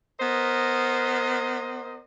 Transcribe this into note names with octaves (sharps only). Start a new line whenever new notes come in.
B3 A#4 C5 D#5